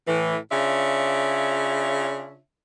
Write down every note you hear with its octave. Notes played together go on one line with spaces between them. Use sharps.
A2 E3
C#3 D4 F4 C#5 E5